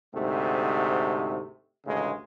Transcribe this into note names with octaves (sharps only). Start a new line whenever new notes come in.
D2 G#2 C3 A3
A1 D2 C#3 G#3